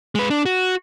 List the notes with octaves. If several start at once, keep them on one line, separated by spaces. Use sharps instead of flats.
G#3 B4
D4
F#4